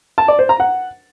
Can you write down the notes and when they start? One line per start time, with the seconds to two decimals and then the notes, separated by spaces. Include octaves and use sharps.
0.18 A5
0.28 D5
0.39 C5
0.49 A#5
0.60 F#5